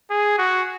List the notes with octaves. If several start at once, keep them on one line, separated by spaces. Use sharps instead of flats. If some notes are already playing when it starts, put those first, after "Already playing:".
G#4
F#4